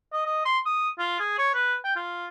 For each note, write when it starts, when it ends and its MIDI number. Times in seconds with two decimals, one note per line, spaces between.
0.13 0.22 75
0.26 0.44 75
0.45 0.59 84
0.66 0.89 87
0.99 1.18 65
1.20 1.34 68
1.38 1.49 73
1.54 1.76 71
1.84 1.94 79
1.96 2.27 65